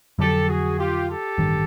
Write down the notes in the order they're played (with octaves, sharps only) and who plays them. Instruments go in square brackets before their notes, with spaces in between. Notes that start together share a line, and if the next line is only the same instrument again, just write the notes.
[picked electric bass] F2 D3 F#3 [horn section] G4 A4
[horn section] F#4 G#4
F4 G4
G4 A4
[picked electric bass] A1 G2 D#3